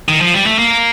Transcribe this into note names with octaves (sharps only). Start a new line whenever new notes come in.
D#3
F3
G3
A3
A#3